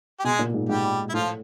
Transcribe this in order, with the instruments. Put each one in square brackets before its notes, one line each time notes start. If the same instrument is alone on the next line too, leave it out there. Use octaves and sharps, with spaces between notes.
[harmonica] G4
[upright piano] B2 [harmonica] G#3 G#4
[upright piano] A#2
G#2
[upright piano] G#2 [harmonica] G3 G4
[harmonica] E4
[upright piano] A2 [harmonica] F3 F4